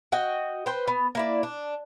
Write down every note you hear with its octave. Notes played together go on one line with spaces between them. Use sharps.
F#4 D#5 G5
B4 C5 G5
B3
A#3 E4 D5
D4